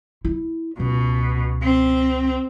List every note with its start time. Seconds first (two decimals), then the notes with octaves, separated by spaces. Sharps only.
0.25 E4
0.80 C#2 B2
1.63 C4